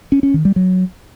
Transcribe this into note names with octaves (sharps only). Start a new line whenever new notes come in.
C#4
C#4
D#3
G3
F#3